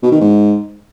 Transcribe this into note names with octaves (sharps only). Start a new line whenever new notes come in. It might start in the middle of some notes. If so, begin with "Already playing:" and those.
B2
D#3
G#2